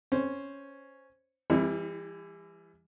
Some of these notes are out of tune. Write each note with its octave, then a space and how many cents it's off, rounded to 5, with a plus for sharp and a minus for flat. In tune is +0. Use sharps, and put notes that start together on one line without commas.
C#4 +0 C5 +0
E3 +25 G3 +40 E4 -20